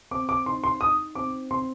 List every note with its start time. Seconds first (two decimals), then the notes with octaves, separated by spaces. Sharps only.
0.11 C4 D6
0.29 D6
0.46 D#4 C6
0.64 C6
0.81 D#4 D#6
1.15 C4 D6
1.51 C4 C6